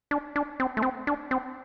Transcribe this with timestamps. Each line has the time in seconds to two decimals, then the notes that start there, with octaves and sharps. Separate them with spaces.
0.11 D4
0.36 D4
0.60 C4
0.77 A3
0.82 C4
1.07 D4
1.31 C4